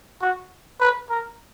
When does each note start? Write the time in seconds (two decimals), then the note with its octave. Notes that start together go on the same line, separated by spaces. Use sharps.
0.21 F#4
0.80 B4
1.10 A#4